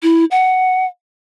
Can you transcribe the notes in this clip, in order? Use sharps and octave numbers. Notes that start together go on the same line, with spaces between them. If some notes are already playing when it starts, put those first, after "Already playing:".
E4
F#5